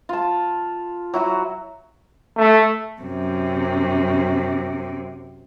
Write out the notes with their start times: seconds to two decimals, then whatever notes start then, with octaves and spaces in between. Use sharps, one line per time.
0.09 F4 A5
1.14 F#3 E4 F#4
2.38 A3
3.01 F#2 C3